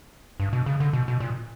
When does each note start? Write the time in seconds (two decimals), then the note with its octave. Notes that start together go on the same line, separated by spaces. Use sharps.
0.40 G2
0.53 B2
0.66 C#3
0.80 D3
0.93 B2
1.08 B2
1.20 A#2